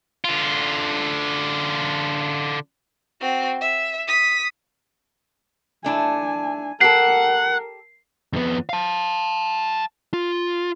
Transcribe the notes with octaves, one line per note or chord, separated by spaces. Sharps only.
D3 F4
C4 F#4
E5
D#6 B6
A3 D4 E4 G#5
G4 A4 A#4 F#5 C7
F2 B3
F5 A5
F4